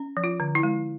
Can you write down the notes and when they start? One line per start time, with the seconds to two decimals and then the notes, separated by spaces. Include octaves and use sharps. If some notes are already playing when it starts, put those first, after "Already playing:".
Already playing: C#4
0.17 F3
0.24 F4
0.40 D3
0.55 E4
0.63 G#3